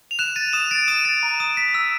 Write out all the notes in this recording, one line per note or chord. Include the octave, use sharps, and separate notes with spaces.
F7
F#6 E7
A6 D#7
D#6 E7
A6 D7
D#6 D#7
A6
A#5
D#6
B6
E6